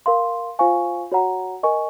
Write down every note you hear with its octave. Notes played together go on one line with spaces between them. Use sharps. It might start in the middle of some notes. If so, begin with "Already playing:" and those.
A#4 F5 C6
F4 C5 F5 G#5 C#6
F#4 C#5 F#5 A#5
A#4 D#5 G#5 C#6